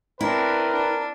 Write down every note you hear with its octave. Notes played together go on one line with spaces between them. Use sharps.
C4 D4 E4 A#4 B4
D4